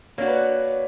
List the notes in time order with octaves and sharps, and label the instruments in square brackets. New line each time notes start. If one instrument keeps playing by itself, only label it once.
[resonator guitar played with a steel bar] A#3 D4 F#4 [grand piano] C#5
[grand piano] B4